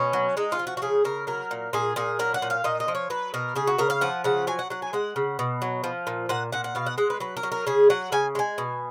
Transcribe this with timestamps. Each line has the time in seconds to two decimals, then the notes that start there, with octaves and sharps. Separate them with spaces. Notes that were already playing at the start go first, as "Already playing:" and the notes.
Already playing: B2 C#4
0.13 F#3
0.37 G#3 D#4
0.52 F4
0.59 F3
0.67 F#4
0.77 F#4
0.82 C#3 G#4
1.05 C#3 A#4
1.27 F#3 A#4
1.51 A#2
1.73 A#2 G#4
1.96 A#2 G#4
2.19 F#3 A#4
2.34 F#5
2.42 A#2
2.50 F5
2.64 A#2 D#5
2.80 D#5
2.88 F3
2.95 C#5
3.10 F#3 B4
3.34 B2 A#4
3.56 C#3 G#4
3.67 F#4
3.78 C#3 A#4
3.90 F5
4.01 F3 F#5
4.24 C#3 F#5
4.47 F#3 G#5
4.59 F#5
4.70 F#3 F#5
4.82 G#5
4.93 G#3 F#5
5.16 C#3
5.39 B2
5.62 F#3
5.84 F3
6.07 A#2
6.29 A#2 F#5
6.52 A#2 F#5
6.64 F#5
6.75 B2 F5
6.86 F#5
6.98 G#3 F#5
7.10 B4
7.20 F#3 B4
7.37 A#4
7.43 F#3
7.52 A#4
7.67 C#3 G#4
7.90 F#3 F#5
8.12 C#3 G#5
8.35 G#3 G#5
8.58 B2